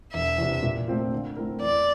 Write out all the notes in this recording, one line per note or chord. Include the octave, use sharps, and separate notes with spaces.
E1 E5
E2 C3
A#2
A3 C4 F4
D3
A3 C4 E4 A#4
E2 D5